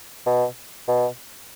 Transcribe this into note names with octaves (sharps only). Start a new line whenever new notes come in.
B2
B2